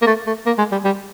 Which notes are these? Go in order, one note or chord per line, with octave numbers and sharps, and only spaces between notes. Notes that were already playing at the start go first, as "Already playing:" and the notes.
A#3
A3
A3
A#3
G#3
G3
G3